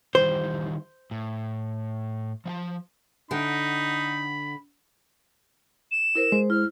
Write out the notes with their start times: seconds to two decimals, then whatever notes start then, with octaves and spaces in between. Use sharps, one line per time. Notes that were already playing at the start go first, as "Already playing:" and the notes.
0.15 D#3 E3 G3 C5
1.11 A2
2.46 F3 F5 A5
3.31 D3 D#4 F#5 G5 B5
5.91 E7
6.15 E4 A#4 C5
6.32 G#3 C5
6.50 E4 F6